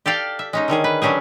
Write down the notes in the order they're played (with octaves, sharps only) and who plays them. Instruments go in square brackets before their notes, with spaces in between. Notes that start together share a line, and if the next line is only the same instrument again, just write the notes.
[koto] G4 A4 D5 F5 G5
E5
G#3 C#4 D#4
D3 D#3 C#4 G#4
B4
D3 F#3 C#4 G4 G#4